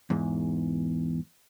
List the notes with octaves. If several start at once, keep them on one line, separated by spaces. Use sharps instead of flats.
E2 G#2